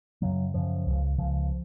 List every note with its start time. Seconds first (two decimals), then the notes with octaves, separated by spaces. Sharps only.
0.22 F#2 C#3 F#3
0.54 F#2 C#3 F3
0.86 C#2 C#3
1.18 C#2 C#3 F3